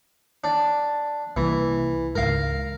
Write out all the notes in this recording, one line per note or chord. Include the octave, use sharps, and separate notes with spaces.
D4
C2 E3 A#3
C#2 G#2 A#4 F5